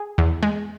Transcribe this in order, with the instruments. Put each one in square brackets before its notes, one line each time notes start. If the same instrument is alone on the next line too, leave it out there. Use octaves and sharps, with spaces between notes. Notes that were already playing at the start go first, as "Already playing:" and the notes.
Already playing: [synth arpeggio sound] G#4
E2
G#3